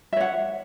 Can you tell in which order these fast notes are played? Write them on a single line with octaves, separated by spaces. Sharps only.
E5 C#5 F#5